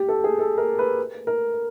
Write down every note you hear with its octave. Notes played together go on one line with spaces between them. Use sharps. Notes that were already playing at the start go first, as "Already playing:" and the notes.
Already playing: G4
A4
G#4
A4
A#4
B4
A#4